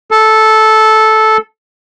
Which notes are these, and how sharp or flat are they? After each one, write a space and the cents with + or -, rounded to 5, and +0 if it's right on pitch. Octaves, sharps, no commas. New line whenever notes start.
A4 -10